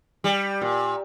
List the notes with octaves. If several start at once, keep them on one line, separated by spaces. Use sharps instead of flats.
G3
A#2